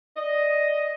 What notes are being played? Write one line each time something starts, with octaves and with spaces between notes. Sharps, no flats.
D5 D#5